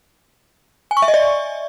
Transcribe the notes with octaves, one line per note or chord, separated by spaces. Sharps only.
G#5
C#6
E5
D#5
D5